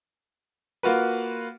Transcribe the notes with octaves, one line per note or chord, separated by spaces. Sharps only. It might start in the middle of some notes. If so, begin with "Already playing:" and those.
A#3 F4 F#4 B4